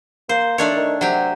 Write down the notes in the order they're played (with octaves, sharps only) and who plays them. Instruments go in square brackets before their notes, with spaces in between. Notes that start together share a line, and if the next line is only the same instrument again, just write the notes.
[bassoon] A#3 [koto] C5
[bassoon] D#3 [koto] A3 D4 C#5
[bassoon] D#3
[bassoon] C3 [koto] F#3 G4